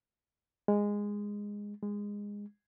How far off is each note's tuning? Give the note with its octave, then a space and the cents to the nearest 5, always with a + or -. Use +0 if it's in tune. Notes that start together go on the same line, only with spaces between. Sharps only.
G#3 -15
G#3 -20